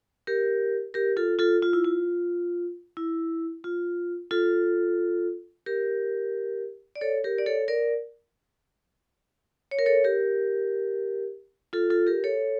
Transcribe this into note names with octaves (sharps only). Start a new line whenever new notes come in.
G4 A#4
G4 A#4
F4 A4
F4 A4
F4
E4
F4
E4
F4
F4 A4
G4 A#4
D5
A4 C#5
G4 A#4
D5
A4 C#5
A#4 D5
C#5
A#4
A4 C#5
G4 A#4
F4 A4
F4 A4
G4 A#4
A4 C#5